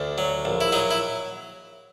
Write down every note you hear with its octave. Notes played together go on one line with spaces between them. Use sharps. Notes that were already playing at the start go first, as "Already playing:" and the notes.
Already playing: D2 D3
F#3
A#1
E4
F#3 D#4
E4